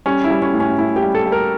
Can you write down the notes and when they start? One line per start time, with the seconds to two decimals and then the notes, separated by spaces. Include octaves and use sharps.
0.06 G3 C#4
0.24 E4
0.30 G3
0.42 C#4
0.54 A2
0.60 C#4
0.78 A2 E4
0.96 G4
1.03 G3
1.15 A4
1.26 G3
1.32 A#4